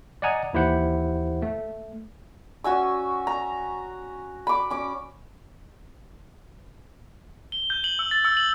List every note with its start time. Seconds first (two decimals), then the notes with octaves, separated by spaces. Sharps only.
0.22 D5 D#5 F#5 G#5 A#5 D#6
0.53 D#2 E3 E4 G4 C5 F#5
1.42 A3
2.64 C#4 F#4 G#5 E6
3.27 A#5
4.47 B5 D6
4.70 C#4 D6
7.52 G7
7.70 G6
7.84 F#7
7.99 E6
8.11 A6
8.25 E6
8.37 F#7